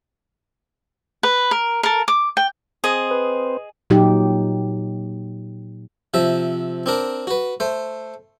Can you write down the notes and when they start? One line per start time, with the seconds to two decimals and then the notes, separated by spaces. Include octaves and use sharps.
1.23 B4
1.51 A#4
1.83 A4 A#4
2.08 D6
2.37 G5
2.84 C4 G#4 C5 D#5
3.11 B4
3.90 A#2 F#3 D#4 G4
6.14 C3 F3 E5
6.86 C4 D4 A#4
7.27 F#4 B4
7.60 A3 C5